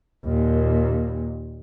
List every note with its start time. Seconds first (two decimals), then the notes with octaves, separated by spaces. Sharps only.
0.25 D#2 A#2